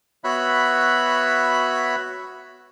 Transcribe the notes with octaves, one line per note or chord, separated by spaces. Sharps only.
B3 F#4 C#5 E5 B5 F#6